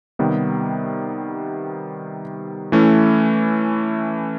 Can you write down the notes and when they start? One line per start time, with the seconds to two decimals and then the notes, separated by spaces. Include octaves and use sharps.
0.19 C3 D#3 G3 B3
2.72 E3 A3 C#4 E4